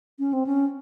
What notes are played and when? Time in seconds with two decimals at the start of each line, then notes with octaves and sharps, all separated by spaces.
0.19 C#4
0.33 C4
0.47 C#4